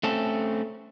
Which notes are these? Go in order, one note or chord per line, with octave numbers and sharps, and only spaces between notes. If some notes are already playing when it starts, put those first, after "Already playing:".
A3 C4 C#4 A4